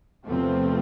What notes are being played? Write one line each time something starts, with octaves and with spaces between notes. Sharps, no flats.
E2 C3 F3 A3 C4